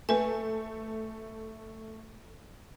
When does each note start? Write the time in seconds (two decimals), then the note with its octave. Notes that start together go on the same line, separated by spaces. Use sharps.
0.09 A3 B4 G#5